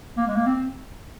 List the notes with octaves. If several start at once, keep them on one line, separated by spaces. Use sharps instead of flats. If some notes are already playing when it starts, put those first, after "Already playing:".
A#3
G#3
A#3
C4